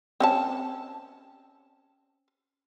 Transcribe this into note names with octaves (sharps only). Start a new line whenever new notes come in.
C4 C#4 A5